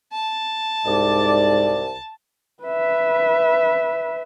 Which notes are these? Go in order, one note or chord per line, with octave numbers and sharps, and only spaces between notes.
A5
C2 G#2 D5
B4 E5